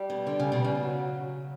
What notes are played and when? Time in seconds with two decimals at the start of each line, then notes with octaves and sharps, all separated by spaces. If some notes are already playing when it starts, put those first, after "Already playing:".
Already playing: G3
0.10 B2
0.27 D3
0.40 C#3
0.52 B2
0.64 C#3
0.80 F#3